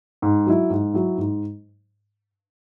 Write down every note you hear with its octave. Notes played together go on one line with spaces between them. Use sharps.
G#2
F#3 E4
G#2
F#3 E4
G#2